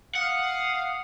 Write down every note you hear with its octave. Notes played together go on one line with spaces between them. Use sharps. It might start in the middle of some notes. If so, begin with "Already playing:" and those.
F5 F#5 D#6